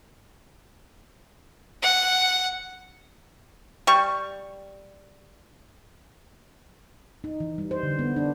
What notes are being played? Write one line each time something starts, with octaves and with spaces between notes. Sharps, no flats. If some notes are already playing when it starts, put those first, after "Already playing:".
F#5
G3 C#6
D#4
E3
G3
C5
D3
B3
D4